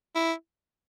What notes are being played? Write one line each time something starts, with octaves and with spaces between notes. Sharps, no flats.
E4